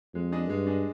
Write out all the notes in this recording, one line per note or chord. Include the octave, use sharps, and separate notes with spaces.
F2 G#3
D4 G#4 D#5
G2 G#3
D4 G#4 D#5